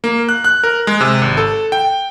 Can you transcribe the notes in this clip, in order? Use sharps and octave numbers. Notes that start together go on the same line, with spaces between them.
A#3
F#6
F#6
A#4
G#3
C3
G#1
A4
G5